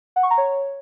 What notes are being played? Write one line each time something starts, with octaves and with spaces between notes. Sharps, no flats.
F#5
C#6
A#5
C#5